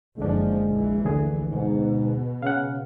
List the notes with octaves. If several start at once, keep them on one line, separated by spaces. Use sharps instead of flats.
F#1 D3 F3 G#3 D4
A#1 E3
D2 D3 G#4
G#2 B2
C#3 F5 F#5